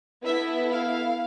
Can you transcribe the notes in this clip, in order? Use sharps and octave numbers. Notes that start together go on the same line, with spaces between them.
B3 E4 A4 E5
F5